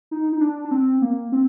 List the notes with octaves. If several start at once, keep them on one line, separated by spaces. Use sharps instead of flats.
D#4
D#4
D4
D4
C4
A#3
C4